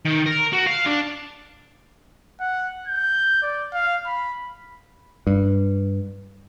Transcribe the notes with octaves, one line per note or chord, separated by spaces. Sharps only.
D#3
A#4
F#4
F5
D4
F#5
G6
D5
F5
B5
G2